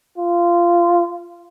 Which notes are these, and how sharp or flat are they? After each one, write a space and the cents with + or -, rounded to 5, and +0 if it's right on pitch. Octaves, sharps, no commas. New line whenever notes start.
F4 -15